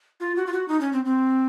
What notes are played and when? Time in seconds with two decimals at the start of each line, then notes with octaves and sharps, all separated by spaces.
0.20 F4
0.36 F#4
0.47 F4
0.53 F#4
0.68 D#4
0.81 C#4
0.93 C4
1.05 C4